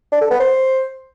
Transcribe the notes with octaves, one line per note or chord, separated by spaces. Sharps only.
D4
A4
B3
C5